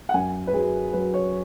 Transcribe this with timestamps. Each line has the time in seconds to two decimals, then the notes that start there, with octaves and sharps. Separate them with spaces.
0.09 F#5
0.14 F#2 G#5
0.47 B4
0.53 F#3 G#4
0.93 F#3 B4
1.14 C#5